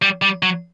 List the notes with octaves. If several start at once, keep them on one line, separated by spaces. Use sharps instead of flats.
G3
G3
F#3